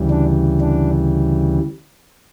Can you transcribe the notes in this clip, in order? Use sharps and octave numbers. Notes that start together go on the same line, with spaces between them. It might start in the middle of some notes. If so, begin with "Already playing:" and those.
Already playing: D2 C#3 E3 G3
D4
D4